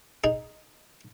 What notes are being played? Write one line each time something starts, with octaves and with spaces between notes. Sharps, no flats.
D#4 G#4